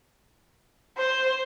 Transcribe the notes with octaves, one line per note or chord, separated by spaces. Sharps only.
C5